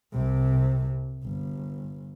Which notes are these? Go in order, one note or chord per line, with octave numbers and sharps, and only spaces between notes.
C2 C3
G1